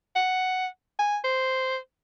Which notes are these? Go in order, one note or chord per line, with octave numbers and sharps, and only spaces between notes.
F#5
G#5
C5